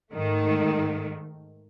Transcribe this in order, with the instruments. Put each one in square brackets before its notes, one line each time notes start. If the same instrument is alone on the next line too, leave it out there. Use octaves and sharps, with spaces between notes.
[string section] G#2 D#3 A3